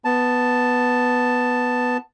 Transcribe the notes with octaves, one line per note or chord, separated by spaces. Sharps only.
B3 A5